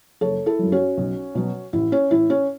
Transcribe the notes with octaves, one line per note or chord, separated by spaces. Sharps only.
F#1 A4 C#5
E4 A4
F#2 F#3
C#4 F#4
B1
B2 F#3
A1 E4
C#4
A2 E3 E4
C#4